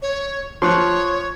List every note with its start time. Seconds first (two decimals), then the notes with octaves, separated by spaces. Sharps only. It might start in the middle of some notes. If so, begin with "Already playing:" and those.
0.02 C#5
0.62 F3 C#5 C6 C#6 F#6